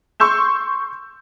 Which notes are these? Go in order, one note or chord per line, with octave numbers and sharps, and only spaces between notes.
C6 C#6 E6 G6 E7